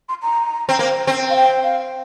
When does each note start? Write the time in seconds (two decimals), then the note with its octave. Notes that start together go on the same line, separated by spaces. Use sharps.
0.09 C6
0.23 A#5
0.69 C4
0.79 A#3
1.07 C4
1.30 F5
1.36 G5
1.63 F5